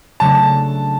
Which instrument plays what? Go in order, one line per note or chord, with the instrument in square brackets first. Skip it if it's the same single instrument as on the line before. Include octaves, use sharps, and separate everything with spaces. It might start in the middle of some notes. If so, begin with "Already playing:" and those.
[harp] C#3 F#3 A3 D4 [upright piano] A5